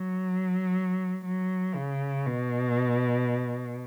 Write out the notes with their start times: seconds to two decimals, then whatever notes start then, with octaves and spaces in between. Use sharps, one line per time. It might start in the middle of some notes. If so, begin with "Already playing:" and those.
Already playing: F#3
1.25 F#3
1.75 C#3
2.26 B2